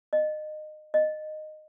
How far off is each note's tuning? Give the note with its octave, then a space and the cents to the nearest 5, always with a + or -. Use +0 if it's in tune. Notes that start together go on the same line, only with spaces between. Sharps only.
D#5 -25
D#5 -15